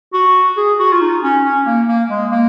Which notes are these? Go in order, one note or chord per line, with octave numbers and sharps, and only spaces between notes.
F#4
G#4
F#4
F4
D#4
C#4
C#4
A#3
A#3
G#3
A#3